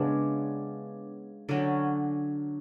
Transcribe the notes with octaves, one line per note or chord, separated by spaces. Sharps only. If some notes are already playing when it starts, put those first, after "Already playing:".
Already playing: C#3 G#3 B3 D4
D3 F#3 C#4 F#4